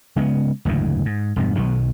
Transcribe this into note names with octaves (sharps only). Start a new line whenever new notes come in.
C#3 G#3 A3 B3
F#1 D2 G#2 E3
G#2
E1 G2 B2
B1 B2 D#3 F#3